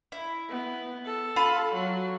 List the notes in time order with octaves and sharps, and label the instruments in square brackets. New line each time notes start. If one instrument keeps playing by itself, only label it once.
[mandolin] E4
[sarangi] B3
A4
[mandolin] F4 B5 C6
[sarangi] F#3